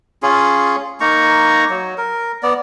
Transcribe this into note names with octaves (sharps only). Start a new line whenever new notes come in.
C#4 F4 G#4
A#3 D#4 A#5 C#6
F#3
A#4
B3 D5